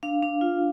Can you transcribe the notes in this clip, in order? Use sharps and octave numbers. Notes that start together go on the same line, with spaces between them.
D4 F5
D4
F4